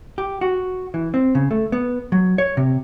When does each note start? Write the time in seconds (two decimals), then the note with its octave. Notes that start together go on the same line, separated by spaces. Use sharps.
0.18 G4
0.41 F#4
0.94 E3
1.14 C4
1.35 C#3
1.51 A3
1.72 B3
2.12 F#3
2.38 C#5
2.57 C3